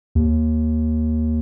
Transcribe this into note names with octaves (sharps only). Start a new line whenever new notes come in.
D#2